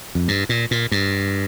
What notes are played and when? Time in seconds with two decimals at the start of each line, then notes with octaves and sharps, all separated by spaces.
0.15 F2
0.28 G2
0.49 A#2
0.71 A#2
0.92 G2